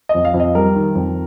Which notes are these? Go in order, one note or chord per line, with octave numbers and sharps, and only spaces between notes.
D#5
F2
F5
F2
D#5
G3 A#4
D#3
F2